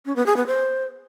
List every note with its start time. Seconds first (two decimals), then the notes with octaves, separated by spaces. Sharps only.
0.06 C#4
0.16 B3
0.26 G#4
0.36 B3
0.47 C5